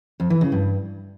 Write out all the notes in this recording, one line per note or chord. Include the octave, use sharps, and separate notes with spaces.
F2
E3
C#3
G2